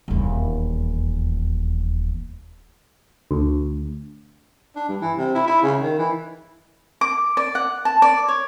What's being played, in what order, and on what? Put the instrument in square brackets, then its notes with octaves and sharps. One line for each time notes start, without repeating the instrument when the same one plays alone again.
[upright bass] D#1 E2
[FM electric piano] D2
[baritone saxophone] D4
G2
E3
C3
E4
E4
C#3
D#3
E3
[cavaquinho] D6
D5
F#5
A5
D5
C#5